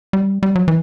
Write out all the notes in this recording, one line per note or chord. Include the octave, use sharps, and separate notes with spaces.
G3
G3
F#3
E3